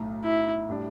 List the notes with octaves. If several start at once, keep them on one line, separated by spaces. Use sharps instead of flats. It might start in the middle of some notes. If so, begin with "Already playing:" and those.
Already playing: B1 A2 A3
E4
A2 G3 D4